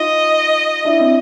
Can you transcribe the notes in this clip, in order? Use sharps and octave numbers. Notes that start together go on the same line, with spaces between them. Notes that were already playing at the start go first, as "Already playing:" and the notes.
Already playing: D#4 F4 D#5
D4 E4
C4